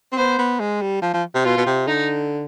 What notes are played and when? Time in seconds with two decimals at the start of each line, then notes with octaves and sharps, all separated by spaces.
0.12 C4
0.17 B3 C5
0.38 B3
0.60 G#3
0.82 G3
1.02 F3
1.14 F3
1.35 C3
1.44 B2 F4
1.57 B2
1.66 C3
1.87 D3 D#4